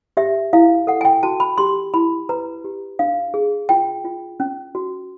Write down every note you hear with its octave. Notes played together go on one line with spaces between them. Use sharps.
G4 E5
E4 F5
A4 F#5
G#5
G5
F#4 A5
B5
G4 C6
E4 B5
B4 A#5
G4
D4 F5
G#4
F4 G5
F4
C#4
F#4